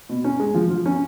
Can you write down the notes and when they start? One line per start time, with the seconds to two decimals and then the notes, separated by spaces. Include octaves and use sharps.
0.09 B2
0.24 C#4
0.40 G#3
0.54 F3
0.70 F3
0.86 C#4